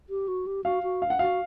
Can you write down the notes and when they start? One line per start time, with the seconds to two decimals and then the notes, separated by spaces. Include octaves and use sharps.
0.10 G4
0.28 F#4
0.47 G4
0.64 F#4 F5
0.83 F#4
1.02 F5
1.10 F#5
1.19 F#4 F5